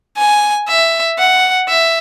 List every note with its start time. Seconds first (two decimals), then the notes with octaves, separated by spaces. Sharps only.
0.18 G#5
0.68 E5
1.18 F#5
1.69 E5